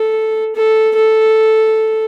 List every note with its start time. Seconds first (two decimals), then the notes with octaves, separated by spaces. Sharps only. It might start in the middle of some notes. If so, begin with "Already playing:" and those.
Already playing: A4
0.56 A4
0.96 A4